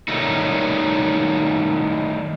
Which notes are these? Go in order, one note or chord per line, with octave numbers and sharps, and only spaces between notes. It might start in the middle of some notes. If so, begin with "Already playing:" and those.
D#3 F#3 G3 A3 D#4